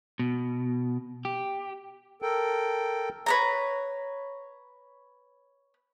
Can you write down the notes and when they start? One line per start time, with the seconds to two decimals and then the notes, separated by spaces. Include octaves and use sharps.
0.19 B2
1.25 G4
2.22 A4 A#4 G5
3.26 B4 C#5 A#5